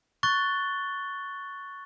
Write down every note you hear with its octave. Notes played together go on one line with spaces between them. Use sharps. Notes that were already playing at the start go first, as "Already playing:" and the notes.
C#6 F#6 A6 G7